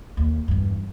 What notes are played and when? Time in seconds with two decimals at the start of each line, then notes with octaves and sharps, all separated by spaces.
0.17 D#2
0.48 E2 G2